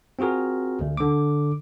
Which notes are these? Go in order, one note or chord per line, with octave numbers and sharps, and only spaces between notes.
C4 F4 F#4 G#4 A#4
D2
D3 D6